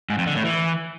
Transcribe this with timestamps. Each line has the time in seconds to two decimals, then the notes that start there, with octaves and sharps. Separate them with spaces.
0.10 G#2
0.18 F2
0.27 D3
0.35 A2
0.44 E3